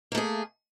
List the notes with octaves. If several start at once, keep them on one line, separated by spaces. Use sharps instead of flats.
A3 A#3 G#4